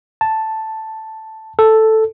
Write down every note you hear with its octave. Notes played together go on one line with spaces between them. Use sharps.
A5
A4